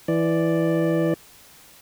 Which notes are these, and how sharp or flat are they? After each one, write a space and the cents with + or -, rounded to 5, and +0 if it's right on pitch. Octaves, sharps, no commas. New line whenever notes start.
E3 +0 D5 +0